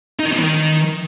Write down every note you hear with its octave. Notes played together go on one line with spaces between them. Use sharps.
D#4
D#3
B2
E3
D#3